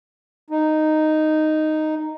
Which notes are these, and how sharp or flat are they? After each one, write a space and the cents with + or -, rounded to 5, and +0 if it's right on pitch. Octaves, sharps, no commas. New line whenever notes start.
D#4 -5